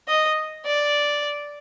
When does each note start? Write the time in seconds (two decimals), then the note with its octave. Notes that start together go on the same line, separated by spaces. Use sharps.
0.08 D#5
0.65 D5